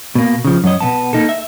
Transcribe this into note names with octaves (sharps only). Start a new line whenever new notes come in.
B2 A#3
C#3 F3
F#2 F#3 C#5 D#5
B2 B3 A5
A#3 D#4 A4
E5